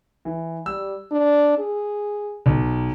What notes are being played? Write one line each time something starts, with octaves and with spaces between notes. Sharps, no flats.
E3
G3 E6
D4
G#4
B1